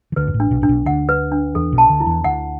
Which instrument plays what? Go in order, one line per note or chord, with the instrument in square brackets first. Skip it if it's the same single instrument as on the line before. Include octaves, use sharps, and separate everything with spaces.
[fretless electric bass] E3
[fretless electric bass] D2 D3 [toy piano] B4
[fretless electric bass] F#2
A1 A2
[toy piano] D4
[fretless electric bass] B1 B2
[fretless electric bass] A2 [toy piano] D4
[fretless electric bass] B1 B2
[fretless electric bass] D2 D3 [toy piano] F#5
[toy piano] B4
D4
[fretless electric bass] E2 E3 [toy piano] A4
[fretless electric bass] B1 B2
[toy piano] A5
[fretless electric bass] D2 D3
[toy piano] E4
[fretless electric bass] E2 E3
[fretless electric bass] D2 D3 [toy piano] F#5